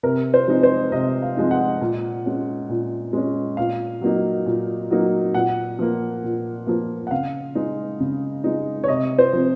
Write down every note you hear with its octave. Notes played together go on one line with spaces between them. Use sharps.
C3 A#4
C5
F3 G#3 C4 D#4
C5
C3 D#5
F5
F3 G#3 C4 D#4
F#5
A#2
G#3 C#4
A#2
G#3 C#4
A#2 F5
F#3 A#3 D#4
A#2
F#3 A#3 D#4
A#2 F#5
F3 A#3
A#2
F3 A#3
F#5
C#3 F5
G#3 D#4
C#3
G#3 D#4
C#5
C3 D#5
C5
F3 C4